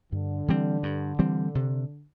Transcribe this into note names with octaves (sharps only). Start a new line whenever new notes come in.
G2 D3
E3 G3 C4
G2
E3 G3 C4
C3